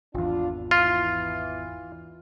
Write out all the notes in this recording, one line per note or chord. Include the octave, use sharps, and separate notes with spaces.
G#1 E2 D4 F4
E3 F4